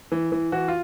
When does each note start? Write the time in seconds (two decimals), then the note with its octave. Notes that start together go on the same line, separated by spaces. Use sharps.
0.12 E3
0.32 E3
0.52 E3 F#4
0.68 F4